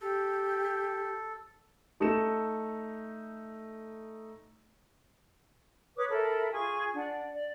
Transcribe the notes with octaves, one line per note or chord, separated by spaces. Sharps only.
G4 A4
A3 D#4 A4 E5 C#7 E7
B4 C#5 D6 D#6
A4 A#4 E5 B5
F4 G#4 G#5 C#6
D4 D5 F#5
D5